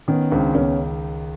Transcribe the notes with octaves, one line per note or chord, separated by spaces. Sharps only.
D#3 B3 C#4
C#2 C4 D4
C#2 B3 C#4